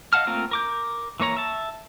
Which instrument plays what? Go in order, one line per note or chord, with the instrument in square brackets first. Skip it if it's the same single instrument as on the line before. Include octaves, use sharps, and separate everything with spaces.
[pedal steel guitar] D#5 F5 F#5 A5 F6
A3 A#3 C4 F4 A#4
A#4 D6 G6
E3 A#3 C#5 A#5
E5 A5